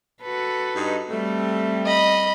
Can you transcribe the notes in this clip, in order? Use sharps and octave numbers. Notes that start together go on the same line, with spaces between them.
F#4 A4 B4
G2 D#4
G3 A3 C4
D#5 B5